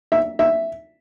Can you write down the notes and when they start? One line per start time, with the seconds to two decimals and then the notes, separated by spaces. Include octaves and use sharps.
0.12 E5
0.39 E5